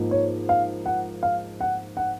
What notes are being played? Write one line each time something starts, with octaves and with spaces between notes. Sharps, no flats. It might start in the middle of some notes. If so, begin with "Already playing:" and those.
Already playing: G#2 F3 A#3 D#4
C#5
F5
F#5
F5
F#5
F#5